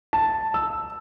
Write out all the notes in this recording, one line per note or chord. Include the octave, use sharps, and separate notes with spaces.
A5
E6